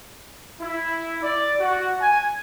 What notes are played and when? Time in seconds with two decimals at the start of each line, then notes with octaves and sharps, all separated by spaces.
0.60 E4
1.22 D5
1.60 F#4
2.01 G#5